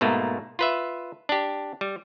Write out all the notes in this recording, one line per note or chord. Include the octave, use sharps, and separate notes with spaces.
G#2 B2 A3 A#3
F4 B4 E5
D4 G4
G3